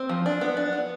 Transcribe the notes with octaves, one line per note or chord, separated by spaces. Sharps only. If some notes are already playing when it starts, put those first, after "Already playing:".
Already playing: C4
F3
D4
B3
D4
B3